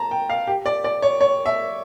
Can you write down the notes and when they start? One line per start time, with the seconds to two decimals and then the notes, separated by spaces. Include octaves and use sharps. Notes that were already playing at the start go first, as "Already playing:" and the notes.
Already playing: A5 A#5
0.11 G5
0.30 F5
0.47 G4
0.66 D5
0.84 D5
1.02 C#5
1.21 C#5
1.46 E5